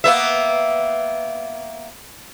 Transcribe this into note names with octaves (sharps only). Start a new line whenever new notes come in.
A#3 B3 E5